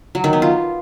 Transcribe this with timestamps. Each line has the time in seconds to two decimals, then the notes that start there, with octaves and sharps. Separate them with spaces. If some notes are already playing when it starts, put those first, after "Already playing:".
0.15 F#3
0.24 D#3
0.33 B3
0.42 F4